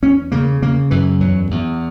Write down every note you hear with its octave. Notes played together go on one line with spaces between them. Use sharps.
E2 C#4
C#3 A#3
C#3 A#3
F#2 E3
E2 F#3
E2